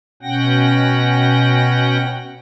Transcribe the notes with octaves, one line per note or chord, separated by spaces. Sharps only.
B2 C#4 F#5 G5 A#6